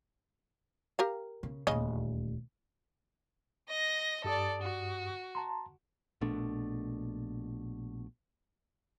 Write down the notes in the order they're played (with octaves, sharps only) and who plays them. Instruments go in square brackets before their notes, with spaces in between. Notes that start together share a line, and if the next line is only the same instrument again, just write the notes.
[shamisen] G4 A#4 F5
[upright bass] C#3
[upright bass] D#1 D2 [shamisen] C#3 D#5
[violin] D#5 A#6
[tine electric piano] G2 G4 D#6 [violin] A4 D5
[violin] F#4
[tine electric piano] A5 A#5 C6
[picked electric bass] A#1 B2 A3 D4